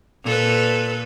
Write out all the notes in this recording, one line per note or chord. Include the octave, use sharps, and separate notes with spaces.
A#2 A4 B4